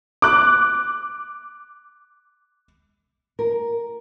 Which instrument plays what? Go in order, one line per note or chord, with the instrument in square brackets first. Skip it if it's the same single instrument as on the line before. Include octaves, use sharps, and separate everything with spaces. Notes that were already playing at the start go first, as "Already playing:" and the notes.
[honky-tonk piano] D6 F#6
[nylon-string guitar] A#4